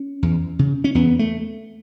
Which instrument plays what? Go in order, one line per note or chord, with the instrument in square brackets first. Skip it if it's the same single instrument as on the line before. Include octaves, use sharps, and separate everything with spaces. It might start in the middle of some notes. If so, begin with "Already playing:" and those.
Already playing: [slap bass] C#4
E2
C#3
C#4
E2 B3
A3